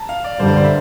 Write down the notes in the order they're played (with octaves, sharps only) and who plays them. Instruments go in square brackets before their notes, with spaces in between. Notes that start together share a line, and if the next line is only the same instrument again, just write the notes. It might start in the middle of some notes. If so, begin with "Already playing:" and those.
Already playing: [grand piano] A5 A#5
F5
D5
[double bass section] G2 D3 G3 [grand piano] C5
[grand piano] D5
C5
E5